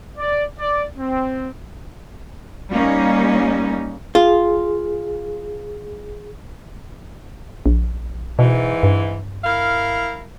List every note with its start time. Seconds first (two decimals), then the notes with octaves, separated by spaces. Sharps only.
0.18 D5
0.59 D5
0.98 C4
2.72 G3 A#3 C#4 D#4
4.15 F4 G#4
7.66 A#1
8.39 G#2 B2 E3
8.83 G2
9.44 E4 A#4 F5